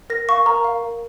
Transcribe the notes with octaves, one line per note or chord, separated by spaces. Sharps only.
A#4 A#6
F5 C#6
A#4 A#5
F5
A#4